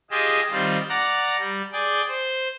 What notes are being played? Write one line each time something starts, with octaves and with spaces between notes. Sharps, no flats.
F4 G4 G#4 D#5 E6
D#3 G3 C4 F4
D5 F#5 A#5 A#6
G3
G#4 D5 G5
C5